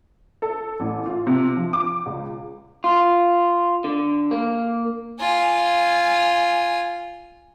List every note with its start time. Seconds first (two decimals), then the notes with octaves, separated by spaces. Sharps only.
0.42 A4
0.80 A1
1.06 F4
1.27 C3
1.56 F3
1.73 D6
2.06 C#2
2.84 F4
3.84 D3
4.31 A#3
5.19 F4 G#5